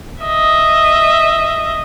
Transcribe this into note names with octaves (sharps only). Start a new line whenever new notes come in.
D#5 E5